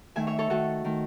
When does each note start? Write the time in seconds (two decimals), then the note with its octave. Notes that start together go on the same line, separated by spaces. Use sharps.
0.16 D#3 A3 E5 G#5
0.27 C#5 E5
0.39 A4 C#5
0.50 D#3 A3 F#4 A4
0.85 D#3 A3